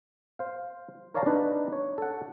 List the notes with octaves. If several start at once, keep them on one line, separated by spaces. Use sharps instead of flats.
C5 F5
A#4 C#5 D5 F5 A5 A#5
D4 D#4 B4
C#5
A4 F#5